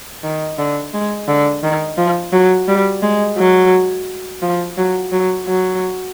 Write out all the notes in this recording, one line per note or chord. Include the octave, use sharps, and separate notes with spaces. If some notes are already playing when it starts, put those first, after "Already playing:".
D#3
D3
G#3
D3
D#3
F3
F#3
G3
G#3
F#3
F3
F#3
F#3
F#3